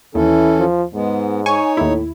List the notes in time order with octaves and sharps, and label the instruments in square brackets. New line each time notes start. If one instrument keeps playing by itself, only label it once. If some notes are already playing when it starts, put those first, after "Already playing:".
[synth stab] D#2 [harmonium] E3 C#4 A4 [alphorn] E4
[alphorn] F3
[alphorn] G#2 [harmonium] G#3 B3
[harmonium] D#4 C#5 [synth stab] G#5 C#6
[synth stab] D#2 E4 [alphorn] A2